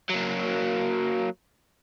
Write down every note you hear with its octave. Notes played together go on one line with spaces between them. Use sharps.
F#3 A#3